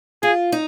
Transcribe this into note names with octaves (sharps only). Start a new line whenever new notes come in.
F4 G#4
D#4